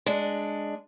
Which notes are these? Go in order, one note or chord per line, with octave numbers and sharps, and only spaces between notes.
G#3 D4